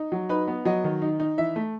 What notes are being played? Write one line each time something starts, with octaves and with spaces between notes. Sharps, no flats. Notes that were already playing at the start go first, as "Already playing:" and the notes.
Already playing: D#4
F#3
D#4 B4
B3
F#3 D#5
D#3
D#4
D#4
E3 E5
A3